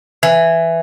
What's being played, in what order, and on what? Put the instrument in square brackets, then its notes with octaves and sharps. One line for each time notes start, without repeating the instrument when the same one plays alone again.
[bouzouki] E3